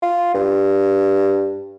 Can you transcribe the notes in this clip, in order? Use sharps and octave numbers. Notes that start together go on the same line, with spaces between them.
F4
G2